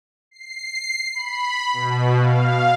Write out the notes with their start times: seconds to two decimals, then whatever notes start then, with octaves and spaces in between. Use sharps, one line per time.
0.31 C7
1.15 B5
1.73 B2
2.17 F5